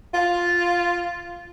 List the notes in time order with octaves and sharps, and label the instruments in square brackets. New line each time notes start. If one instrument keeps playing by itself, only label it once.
[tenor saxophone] F4